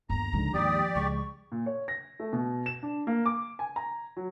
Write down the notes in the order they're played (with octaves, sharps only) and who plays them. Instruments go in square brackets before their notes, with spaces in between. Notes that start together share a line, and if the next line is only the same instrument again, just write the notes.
[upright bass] G1 D#2 [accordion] A#5
[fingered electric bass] C#2 G#2 D3 [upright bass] F3
[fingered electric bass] D#2 G#2 [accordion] G4 D5 [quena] D#6
[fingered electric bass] C#2 G3 G#3 [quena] C#6
[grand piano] A#2
C#5
A#6
A3
B2
E7
D4
A#3
D6
G#5
A#5
F#3